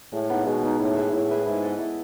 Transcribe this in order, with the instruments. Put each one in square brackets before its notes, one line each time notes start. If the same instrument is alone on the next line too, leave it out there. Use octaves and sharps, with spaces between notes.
[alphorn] A2 [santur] G#3
[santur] B3 D#4
[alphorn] B2 [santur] G#3
[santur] B3 D#4
[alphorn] A2 [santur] E4
[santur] G#4 B4 E5
[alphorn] A2 [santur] E4
[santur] G#4 B4 E5
[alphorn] G#2 [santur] E4
[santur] A4 D#5
E4